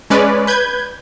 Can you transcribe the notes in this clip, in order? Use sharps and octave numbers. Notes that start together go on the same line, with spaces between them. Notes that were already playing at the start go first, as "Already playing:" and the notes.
G#3 C#4 B4 D5
B4 G6 G#6